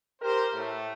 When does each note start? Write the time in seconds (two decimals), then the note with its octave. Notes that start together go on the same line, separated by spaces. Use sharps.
0.22 G4 A#4 C5
0.54 A2 A3